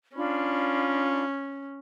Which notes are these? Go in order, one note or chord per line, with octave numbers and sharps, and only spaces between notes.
C#4 D4 F4 B5